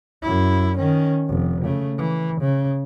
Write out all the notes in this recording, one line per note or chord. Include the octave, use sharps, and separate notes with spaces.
F#2 E4
D#3 C#4
F1
C#3 A3
E3
C#3